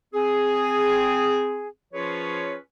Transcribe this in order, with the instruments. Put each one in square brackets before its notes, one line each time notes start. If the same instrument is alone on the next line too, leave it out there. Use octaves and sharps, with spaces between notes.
[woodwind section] C4 G#4
F3 C#4 F4 G#4 B4 C#5